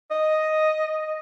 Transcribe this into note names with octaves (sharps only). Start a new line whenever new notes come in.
D#5